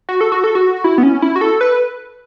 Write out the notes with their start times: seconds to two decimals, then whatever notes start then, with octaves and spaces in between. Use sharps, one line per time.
0.09 F#4
0.21 A4
0.32 F#4
0.44 A4
0.55 F#4
0.84 E4
0.98 B3
1.03 C#4
1.22 E4
1.36 F#4
1.41 A4
1.61 B4